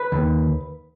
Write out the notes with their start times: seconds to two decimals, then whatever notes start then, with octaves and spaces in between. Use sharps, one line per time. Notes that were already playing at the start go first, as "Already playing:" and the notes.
Already playing: B4
0.12 D#2